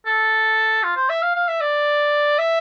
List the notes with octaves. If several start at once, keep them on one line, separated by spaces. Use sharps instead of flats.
A4
F4
C5
E5
F5
F5
E5
D5
E5